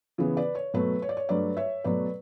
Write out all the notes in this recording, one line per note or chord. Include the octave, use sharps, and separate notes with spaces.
C#3 E3 B3
B4 D5
C#5
B2 F#3 A3 B4
C#5
D5
C#5
G2 F#3 A3 B4 D5
C#5 E5
B2 F#3 A3 B4 D5